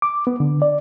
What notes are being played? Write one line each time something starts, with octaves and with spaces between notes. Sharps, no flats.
D6
B3
D3
D5